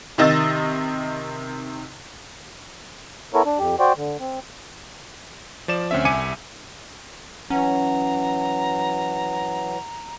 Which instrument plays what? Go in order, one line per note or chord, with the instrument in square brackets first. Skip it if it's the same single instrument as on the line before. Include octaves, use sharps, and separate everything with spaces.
[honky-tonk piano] C3 D#3 D#5 E6 A6
[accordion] B3 E4 A4 A#4 C#5
D4
F2 G4
F#4 C5 D5 G5
D3
C4
[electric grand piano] F3 D5 E7
D2 C4 C#4 E5
C2 E5 G#5 D6 C#7 D#7
[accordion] E3 F#3 [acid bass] C#4 [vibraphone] F#5 [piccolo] A#5